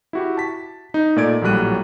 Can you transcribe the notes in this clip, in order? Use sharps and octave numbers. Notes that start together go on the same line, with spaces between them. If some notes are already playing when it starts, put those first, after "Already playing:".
E4 F#4 G4
A5 B6
D#4
A#2 A3 D5 G#6 D7
A#1 A2 F#3 G3 F#6 D#7